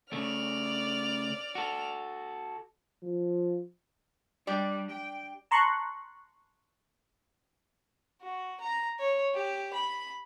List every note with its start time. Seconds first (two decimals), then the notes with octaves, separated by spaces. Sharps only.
0.13 C#3 A3 D5 F6
1.55 F#4 A4
3.03 F3
4.47 G3 D4 G4 D5
4.91 G5
5.51 A5 A#5 C6 C#6 F#6
8.22 F#4
8.60 A#5
8.99 C#5
9.35 G4
9.73 B5